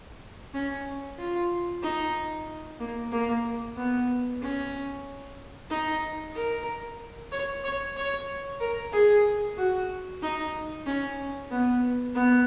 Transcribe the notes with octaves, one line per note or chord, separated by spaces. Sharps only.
C#4
F4
D#4
A#3
A#3
B3
C#4
D#4
A#4
C#5
C#5
C#5
A#4
G#4
F#4
D#4
C#4
B3
B3